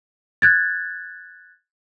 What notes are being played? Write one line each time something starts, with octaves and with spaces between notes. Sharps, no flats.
F#6 G#6 A6